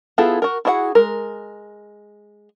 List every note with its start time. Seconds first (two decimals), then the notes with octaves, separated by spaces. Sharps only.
0.18 B3 E4 F4 G#4 A4
0.42 F#4 A#4
0.65 E4 F#4 G#4 D#5 F#5
0.95 G#3 A#4